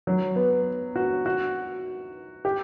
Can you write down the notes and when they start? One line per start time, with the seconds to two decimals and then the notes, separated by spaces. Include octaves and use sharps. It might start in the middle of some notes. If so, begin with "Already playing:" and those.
0.07 F#3
0.36 B3
0.96 F#4
1.26 F#4
2.45 G4